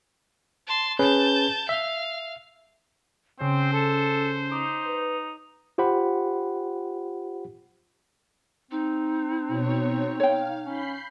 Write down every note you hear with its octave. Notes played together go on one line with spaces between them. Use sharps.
A5 C6
C#4 G#4 B4 A5 G6
E5 F5
C#3 C4 C#4 C5
A4
D#4 D6
B4
F4 G4 C5 F#5 B5
C4 D#4
B2 C#5
C#5 F5 G5
C#4 B5 G6 C7